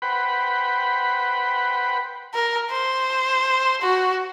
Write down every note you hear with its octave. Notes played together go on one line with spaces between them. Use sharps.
B4 C5 F#5 G5 B5
A#4
C5
F#4